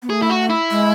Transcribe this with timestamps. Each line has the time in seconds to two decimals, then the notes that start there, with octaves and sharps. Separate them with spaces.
0.02 B3
0.10 A3 G#4
0.22 E4
0.30 F#4
0.50 E4
0.71 G#3